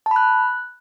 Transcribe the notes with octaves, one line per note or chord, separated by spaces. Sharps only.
A5
B5
F#6